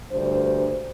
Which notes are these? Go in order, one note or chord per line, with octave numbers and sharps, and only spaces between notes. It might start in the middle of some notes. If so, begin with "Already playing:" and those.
D2 G2 C5